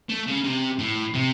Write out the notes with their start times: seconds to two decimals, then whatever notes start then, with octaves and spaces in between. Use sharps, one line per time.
0.09 A3
0.27 C#3
0.44 C3
0.79 A2
1.14 C3